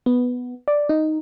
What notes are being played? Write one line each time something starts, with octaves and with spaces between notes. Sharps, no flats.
B3
D5
D#4